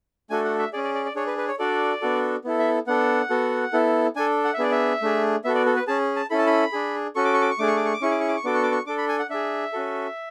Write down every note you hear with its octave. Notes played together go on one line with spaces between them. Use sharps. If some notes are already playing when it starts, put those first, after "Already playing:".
A3 D4 F#4 A4 G#5
F#5
E5
C#4 G#4 D5
D5
D5
D5
D4 G#4 C#5
B4
B4
C#5
D4 F#4 A4 D5
B3 D4 F#4 A4
B3 E4 A4
E5
B3 D4 A4 F#5
B3 F#4 A4
B3 E4 A4
D4 A4 G#5
F#5
E5
B3 D4 G#4 D5
E5
A3 D4 G#4
B3 F#4 A4 E5
D5
A4
B4
C#4 G#4 A5
A5
C#4 E4 A4 B5
A5
B5
D4 G#4
C#4 F#4 A4 C#6
D6
C#6
D6
C#6
A3 D4 G#4 D6
C#6
D6
C#6
D6
C#4 E4 G#4 C#6
D6
C#6
D6
C#6
B3 D4 F#4 A4 D6
C#6
D6
C#6
D4 A4 D6
B5
G#5
F#5
D4 G#4 E5
C#4 F#4 A4